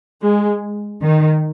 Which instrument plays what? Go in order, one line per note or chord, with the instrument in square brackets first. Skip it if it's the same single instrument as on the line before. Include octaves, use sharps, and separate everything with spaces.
[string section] G#3
D#3